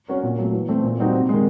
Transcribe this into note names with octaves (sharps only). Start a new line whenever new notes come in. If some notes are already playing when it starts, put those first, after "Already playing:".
A#3 C#4 F#4 A#4
A#2
F#3 A3
E3
A3 C4
A#2
G3 C4 D#4 F#4
C3
D#3 G#3